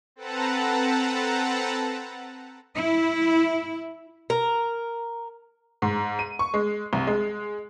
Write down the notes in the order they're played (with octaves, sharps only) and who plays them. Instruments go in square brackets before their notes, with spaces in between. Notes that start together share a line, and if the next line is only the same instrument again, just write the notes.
[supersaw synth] C4 A4 B4 F#5 A5 A#5
[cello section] E4
[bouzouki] A#4
[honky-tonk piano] G#2
D#7
C#6
G#3
C2
G#3